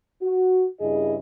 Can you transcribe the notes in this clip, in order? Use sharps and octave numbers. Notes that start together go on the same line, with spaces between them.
F#4
G2 C#3 E4 G#4 D#5